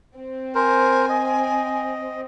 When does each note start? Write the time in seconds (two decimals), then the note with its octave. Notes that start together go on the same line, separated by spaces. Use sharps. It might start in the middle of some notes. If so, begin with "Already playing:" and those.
0.17 C4
0.55 A#4 C5 G#5
1.09 D#5